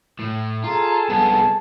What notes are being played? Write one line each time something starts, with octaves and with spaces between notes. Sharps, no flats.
A2
F4 G#4 A4 A#5
C2 B3 A5